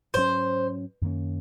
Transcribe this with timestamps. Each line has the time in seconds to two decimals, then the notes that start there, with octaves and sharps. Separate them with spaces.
0.14 G#2 F#3 C#4 C5
1.01 F#2 D#3 A#3 C#4